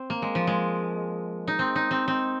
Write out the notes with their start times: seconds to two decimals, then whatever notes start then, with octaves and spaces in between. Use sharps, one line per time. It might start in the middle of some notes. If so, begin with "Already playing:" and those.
Already playing: C4
0.10 A#3
0.22 G#3
0.35 F3
0.47 G#3
1.48 D#4
1.59 C4
1.76 D#4
1.91 C4
2.08 C4